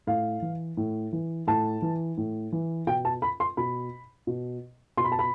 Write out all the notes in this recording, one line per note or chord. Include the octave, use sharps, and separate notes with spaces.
A2 F5
E3
A2
E3
A2 A5
E3
A2
E3
B2 G5
A5
B5
C6
B2 B5
B2
B2 C6
B5
A5
B5